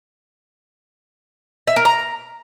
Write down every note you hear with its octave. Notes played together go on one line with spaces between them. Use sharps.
E5
A#4
A#5